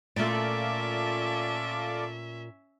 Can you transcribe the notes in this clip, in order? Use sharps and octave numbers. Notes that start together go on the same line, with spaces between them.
A#2 A3 C#4 F4 A4 D5 E5